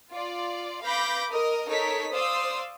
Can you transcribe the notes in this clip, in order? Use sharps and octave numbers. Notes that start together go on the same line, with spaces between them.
F4 D5
B4 F5 B5 D6 G6 A#6
A#4 D#5 D#6
D#4 A4 A#4 C#5 B6
C5 D5 F5 C6 D#6 E6